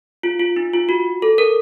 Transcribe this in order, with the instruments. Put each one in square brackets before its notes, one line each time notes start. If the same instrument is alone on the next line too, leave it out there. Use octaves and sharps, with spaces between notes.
[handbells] F4
F4
D#4
F4
F#4
A4
A#4